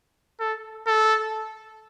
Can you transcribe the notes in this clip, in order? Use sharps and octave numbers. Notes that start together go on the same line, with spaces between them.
A4
A4